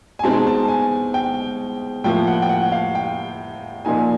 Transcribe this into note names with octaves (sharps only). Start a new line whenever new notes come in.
G#5
B2 G#3 C4 D#4 A5
A5
G#5
G5
A2 F3 A#3 G5
F#5
G5
F#5
F5
G5
A#2 F3 A#3 D#4 G#5